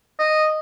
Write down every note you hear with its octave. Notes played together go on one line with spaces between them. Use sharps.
D#5